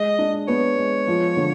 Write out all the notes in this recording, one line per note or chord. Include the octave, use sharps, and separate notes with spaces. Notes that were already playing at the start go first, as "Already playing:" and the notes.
Already playing: G#3 D#5
D4
B3 C#5
G#3
F3
D3